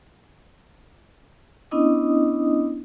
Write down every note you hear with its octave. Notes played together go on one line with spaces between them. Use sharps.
B3 C#4 D4 E4 D#5 D#6